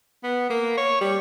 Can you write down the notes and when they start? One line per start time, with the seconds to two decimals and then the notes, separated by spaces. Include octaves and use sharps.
0.23 B3
0.50 A#3
0.77 C#5
1.01 G3